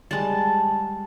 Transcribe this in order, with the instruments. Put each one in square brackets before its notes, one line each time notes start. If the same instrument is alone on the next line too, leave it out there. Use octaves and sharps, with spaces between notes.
[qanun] G3 G#3 [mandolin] A5